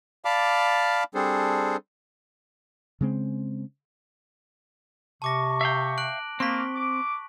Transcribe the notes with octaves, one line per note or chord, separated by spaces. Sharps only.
D5 F5 A5 B5 D6 F6
G3 C4 D4 G#4 A4 C5
C#3 G#3 C4
C3 A5 C#6 D6 A#6
E5 F5 G5
F#6 D7 F#7
A#3 C4 C#6 B6
D6